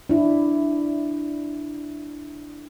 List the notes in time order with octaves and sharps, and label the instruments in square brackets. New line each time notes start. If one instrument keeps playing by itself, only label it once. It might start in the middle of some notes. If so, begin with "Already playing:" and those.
[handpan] D4 E4